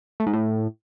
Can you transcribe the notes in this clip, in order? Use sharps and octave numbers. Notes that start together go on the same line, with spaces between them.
A3
G#2
A2